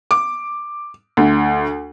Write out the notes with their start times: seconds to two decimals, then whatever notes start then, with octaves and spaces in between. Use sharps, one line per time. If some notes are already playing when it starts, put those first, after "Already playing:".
0.11 D6
1.17 D2